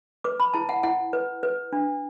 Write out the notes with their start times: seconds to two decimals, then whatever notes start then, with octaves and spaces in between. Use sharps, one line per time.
0.24 B4 D6
0.40 B5
0.54 E4 A5
0.69 F#5
0.83 E4 F#5
1.13 B4
1.43 B4
1.73 D4